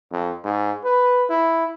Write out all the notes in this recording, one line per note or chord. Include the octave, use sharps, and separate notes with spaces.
F2
G#2
B4
E4